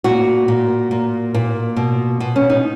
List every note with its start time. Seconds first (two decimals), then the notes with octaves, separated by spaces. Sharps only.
0.04 A#2 F#4
0.48 A#2
0.91 A#2
1.34 A#2
1.77 B2
2.20 B2
2.36 C#4
2.50 D#4